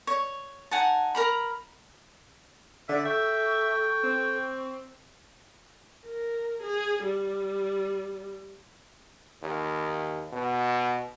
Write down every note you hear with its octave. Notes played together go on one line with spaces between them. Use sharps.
C#5
D#4 F#5 G#5 A5
A#4 A#5 B5
D3 D5 E5
A4 E5 G5 C#6
C4
A#4
G#4
G3
D#2
B2